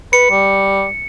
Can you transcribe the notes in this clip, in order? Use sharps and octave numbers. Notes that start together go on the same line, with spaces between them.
B4 C#7
G3